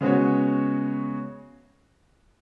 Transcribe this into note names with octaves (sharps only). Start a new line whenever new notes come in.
C#3 G#3 B3 F#4 C#5